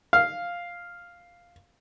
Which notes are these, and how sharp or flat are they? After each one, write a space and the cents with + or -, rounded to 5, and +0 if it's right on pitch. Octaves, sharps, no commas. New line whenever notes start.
F5 +0